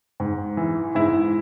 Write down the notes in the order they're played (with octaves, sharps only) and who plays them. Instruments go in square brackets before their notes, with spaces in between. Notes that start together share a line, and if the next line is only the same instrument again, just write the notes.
[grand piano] G#2
E3
G#2 E4